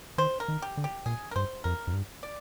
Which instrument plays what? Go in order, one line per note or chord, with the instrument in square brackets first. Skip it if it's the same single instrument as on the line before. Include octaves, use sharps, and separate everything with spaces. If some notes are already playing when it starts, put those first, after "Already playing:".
[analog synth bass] D#3 [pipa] C5
[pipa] A#4
[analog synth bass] D#3
[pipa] G4
[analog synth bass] D3
[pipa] G4
[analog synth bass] A#2 [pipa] G#4
[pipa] A#4
[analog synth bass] G2 [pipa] C5
[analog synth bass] F2 [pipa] A#4
[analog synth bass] F2
G2
[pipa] D5